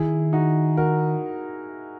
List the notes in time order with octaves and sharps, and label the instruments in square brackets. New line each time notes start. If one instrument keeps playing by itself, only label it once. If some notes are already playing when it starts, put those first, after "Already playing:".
Already playing: [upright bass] D#3 [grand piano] E4 G#4
[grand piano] D#4 F#4
F#4 A#4